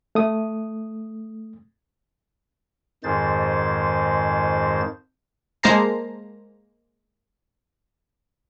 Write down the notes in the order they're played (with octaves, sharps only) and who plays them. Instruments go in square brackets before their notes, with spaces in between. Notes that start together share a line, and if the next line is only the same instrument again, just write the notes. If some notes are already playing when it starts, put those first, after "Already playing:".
[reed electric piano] A3 D#6
[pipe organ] F2 G#2 D#3 G#3 C5 A6
[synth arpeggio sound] G#3 A#3 C5 A5 A#5 C7